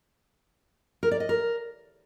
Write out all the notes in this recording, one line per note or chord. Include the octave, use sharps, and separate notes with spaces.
A#4
D5
D#5
A#4